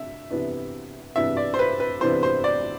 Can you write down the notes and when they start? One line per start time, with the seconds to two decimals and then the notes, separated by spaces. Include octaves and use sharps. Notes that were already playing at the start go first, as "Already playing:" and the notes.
Already playing: C3 D4 E5
0.30 C3 E3 B3 D4
1.16 C3 E3 B3 D4 E5
1.37 D5
1.54 C5
1.59 B4
1.80 B4
2.01 C3 E3 B3 D4 C5
2.23 C5
2.44 D5